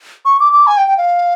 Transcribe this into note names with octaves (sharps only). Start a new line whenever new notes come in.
C#6
D6
D6
G#5
G5
G5
F5